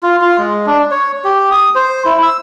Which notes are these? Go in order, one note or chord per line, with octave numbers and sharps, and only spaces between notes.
F4
F4
G#3
D4
C#5
G4
D#6
C5
E4
E6